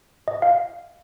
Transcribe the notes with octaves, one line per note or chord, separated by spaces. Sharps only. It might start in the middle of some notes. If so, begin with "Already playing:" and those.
D#5
F5